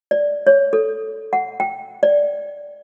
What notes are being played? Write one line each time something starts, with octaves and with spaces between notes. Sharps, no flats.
D5
C#5
A4
F#5
G5
D5